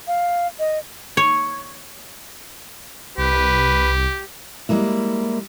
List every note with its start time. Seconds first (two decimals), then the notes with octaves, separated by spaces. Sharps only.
0.07 F5
0.59 D#5
1.17 C#5
3.18 C2 G4 B4
4.69 G3 G#3 A#3 E4